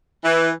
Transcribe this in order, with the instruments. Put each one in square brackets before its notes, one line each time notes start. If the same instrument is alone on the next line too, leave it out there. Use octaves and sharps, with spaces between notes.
[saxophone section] E3